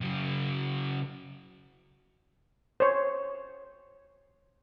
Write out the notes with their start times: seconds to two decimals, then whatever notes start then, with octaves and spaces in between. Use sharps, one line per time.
0.01 C#3 F#3
2.80 C5 C#5